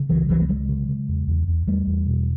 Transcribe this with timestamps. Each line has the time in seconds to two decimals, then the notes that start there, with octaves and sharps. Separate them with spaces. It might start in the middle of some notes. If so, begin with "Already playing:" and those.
Already playing: C#3
0.09 C#2 E3 F#3
0.29 C#2 E3 F#3
0.41 A3
0.49 C#3 F#3 G#3
0.69 C#3
0.88 C#3
1.08 E2
1.28 E2
1.48 E2
1.67 E2 G3 A3
1.87 E2
2.07 B2